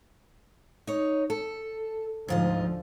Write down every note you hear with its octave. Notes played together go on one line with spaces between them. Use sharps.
D#4 C#5
A4
D2 G#2 D3 F3 F4 D#5